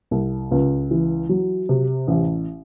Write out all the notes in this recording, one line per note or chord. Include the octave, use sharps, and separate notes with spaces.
C2
C#2
E3
F#3
C3
A1